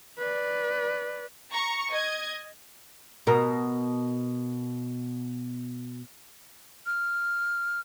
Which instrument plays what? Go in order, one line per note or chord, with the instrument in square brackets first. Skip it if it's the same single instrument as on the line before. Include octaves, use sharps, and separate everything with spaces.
[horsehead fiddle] B4 D5
[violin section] A#5 C#6
D#5 G#6
[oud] B2 A#4
[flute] F6